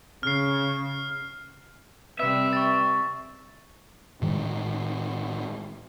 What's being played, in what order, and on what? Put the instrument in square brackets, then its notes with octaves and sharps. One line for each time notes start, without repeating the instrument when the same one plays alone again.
[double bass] C#3 [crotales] F6 C7
[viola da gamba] C3 G3 C4 [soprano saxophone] B4 [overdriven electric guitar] E5
[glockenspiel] C#6 A6
[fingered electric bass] A2 D#3 G#3